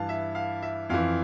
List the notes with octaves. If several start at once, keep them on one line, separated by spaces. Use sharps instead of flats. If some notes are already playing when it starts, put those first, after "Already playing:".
Already playing: G2 E3 F5 A5
E5
F5
E5
F2 E3 F5